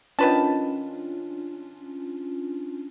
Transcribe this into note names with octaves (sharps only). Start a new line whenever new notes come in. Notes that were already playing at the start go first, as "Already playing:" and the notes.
D#3 C#4 D4 F4 B4 A5